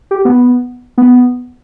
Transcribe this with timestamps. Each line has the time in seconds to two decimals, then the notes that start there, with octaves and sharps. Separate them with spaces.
0.11 G4
0.25 B3
0.98 B3